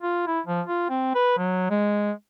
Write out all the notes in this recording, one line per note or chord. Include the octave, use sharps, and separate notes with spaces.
F4
E4
F3
F4
C4
B4
F#3
G#3